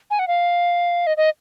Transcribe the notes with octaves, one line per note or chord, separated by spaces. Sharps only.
G#5
F#5
F5
D#5
D#5